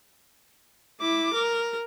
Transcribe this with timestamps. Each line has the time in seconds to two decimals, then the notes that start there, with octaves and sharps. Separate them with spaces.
1.00 E4 D6
1.34 A#4